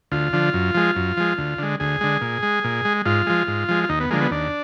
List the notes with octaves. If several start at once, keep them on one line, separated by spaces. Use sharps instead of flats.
D2 F4
D3 F3
F#2
F3 G#3
F#2
F3 G#3
D2
D3 G#3
D2 G#4
D3 G#3
A#2
G#3
A#2
G#3
G#2 F4
F3 G#3
G#2
F3 G#3
F4
D#2 D#4
B3
D3 F3 G#3 A#3
B3
D#2 D4